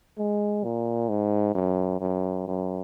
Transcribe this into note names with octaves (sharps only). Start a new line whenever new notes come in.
G#3
A#2
G#2
F#2
F#2
F#2